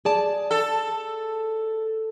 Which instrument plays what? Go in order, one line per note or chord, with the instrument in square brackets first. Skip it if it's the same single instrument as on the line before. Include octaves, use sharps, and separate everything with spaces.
[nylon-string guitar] G#4 D5 A5
[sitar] A4